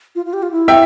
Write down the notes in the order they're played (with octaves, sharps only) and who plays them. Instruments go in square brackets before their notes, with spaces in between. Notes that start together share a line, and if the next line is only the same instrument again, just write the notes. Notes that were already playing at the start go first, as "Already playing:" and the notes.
[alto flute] F4
F4
G4
F4
E4
[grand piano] E5 G5